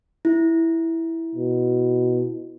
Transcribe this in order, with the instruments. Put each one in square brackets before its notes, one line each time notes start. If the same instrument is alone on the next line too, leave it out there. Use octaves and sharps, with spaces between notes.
[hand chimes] E4
[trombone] B2